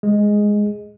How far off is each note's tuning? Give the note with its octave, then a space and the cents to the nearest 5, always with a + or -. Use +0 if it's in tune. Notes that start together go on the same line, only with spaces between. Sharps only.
G#3 +0 G#4 -5